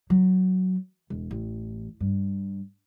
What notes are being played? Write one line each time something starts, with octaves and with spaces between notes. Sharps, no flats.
F#3
E1
A1
G2